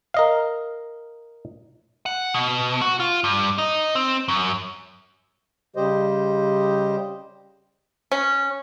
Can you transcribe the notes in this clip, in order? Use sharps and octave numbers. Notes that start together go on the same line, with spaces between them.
A#4 D#5 F5
F#5
B2
F#4
F4
G2
D#4
C4
F#2
C#3 G3 G4 C5 D#5
C#4